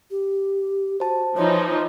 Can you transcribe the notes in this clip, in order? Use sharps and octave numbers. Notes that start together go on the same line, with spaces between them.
G4
F#4 C5 A5
E3 F3 D#4 C#5